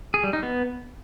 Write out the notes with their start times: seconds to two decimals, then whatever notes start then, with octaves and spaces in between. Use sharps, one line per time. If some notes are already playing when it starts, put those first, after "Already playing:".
0.14 G#4
0.24 G3
0.33 D#4
0.43 B3